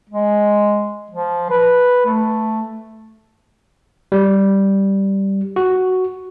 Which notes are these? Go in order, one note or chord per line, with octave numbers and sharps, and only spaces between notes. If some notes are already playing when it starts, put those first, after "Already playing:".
G#3
F3
B4
A3
G3
F#4